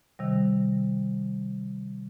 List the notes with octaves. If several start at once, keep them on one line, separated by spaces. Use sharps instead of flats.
C3 D#3 G3